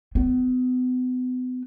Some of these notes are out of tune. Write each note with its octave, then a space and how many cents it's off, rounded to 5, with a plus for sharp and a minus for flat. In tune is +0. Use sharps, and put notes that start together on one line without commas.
B3 +40